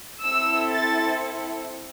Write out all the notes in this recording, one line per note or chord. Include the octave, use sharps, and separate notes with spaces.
C4 E4 A4 E6
A6